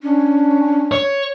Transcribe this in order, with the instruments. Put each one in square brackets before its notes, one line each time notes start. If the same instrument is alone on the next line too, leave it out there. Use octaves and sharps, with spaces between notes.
[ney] C#4 [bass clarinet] D4
[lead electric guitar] C#5